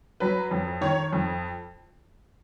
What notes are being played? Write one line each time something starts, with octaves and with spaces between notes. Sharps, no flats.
F#3 B4
F2
D#3 C#5
F2